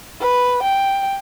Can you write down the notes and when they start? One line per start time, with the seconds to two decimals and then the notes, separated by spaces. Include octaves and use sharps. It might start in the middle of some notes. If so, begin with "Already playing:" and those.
0.21 B4
0.63 G5